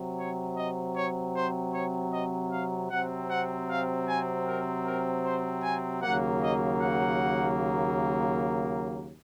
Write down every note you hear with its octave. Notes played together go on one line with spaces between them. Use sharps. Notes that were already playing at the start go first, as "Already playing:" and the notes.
Already playing: C3 F#3 C4
C#5
D#5
C#5
C5
C#5
D#5
F5
C3 F#3 C4 F#5
F#5
F5
G#5
A#4
A#4
C5
G#5
D#2 C#3 F#3 A#3 F#5
D#5
F#5